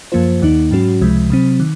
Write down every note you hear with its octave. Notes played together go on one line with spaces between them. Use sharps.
F#2 F3 A#3 F4 C5
D#2 D#3 A#3 D#4
G#2 F#3 C#4 F#4
C#2 C3 F3 G#3
C3 F#3 C4
D#3